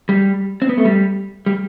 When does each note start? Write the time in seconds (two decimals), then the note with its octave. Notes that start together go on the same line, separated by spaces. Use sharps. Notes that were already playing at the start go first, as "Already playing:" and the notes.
0.09 G3
0.62 C4
0.69 B3
0.78 A3
0.85 G3
1.46 G3